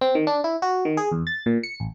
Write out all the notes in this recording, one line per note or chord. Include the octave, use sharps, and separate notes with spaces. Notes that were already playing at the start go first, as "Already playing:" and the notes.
C4
D#3
D4
E4
F#4
D#3
G#4
E2
A6
A#2
C#7
A1